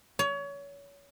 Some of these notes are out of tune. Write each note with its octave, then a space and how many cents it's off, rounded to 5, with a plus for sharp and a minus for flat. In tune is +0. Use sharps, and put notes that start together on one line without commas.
C#5 +30